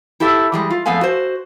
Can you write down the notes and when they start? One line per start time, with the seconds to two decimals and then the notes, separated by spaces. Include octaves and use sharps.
0.20 E4 G4 A4 E5
0.52 E3 G3 G#3
0.70 F4
0.86 F2 G#3 A3 B3 F5 G#5
1.01 F#4 C5